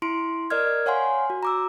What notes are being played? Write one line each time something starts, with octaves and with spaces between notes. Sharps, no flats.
E4 C6 D7
A#4 D5 D#5 F6 G#6
C#5 F5 F#5 G#5 C6
F#4
A#5 D6 E6